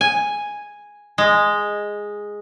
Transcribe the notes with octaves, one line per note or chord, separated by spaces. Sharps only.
G#5
G#3